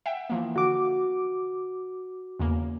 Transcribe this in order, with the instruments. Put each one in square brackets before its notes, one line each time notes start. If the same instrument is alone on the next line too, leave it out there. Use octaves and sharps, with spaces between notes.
[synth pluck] E5 F#5 G5
E3 F3 A#3
[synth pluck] D3 [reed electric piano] F#4 D6
[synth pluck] E2 C#3 A#3